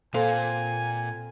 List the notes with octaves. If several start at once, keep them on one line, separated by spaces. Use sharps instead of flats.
A#2 C4 A4 C5 F5 G#5